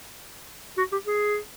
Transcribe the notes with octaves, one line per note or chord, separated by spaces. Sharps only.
F#4
G4
G#4